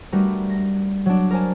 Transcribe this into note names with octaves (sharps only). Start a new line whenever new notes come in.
G3 A3 D4 F#4 A#4 B4
A#6
F#3 D4
A#4 C5 G#5 A5